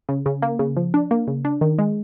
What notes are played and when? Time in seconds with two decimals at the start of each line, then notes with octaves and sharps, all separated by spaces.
0.09 C#3
0.26 C#3
0.42 A#3
0.59 C#3
0.77 F3
0.94 D4
1.11 A#3
1.28 C#3
1.45 D4
1.61 D#3
1.79 G#3